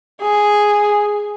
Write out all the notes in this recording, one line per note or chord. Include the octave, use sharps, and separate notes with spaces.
G#4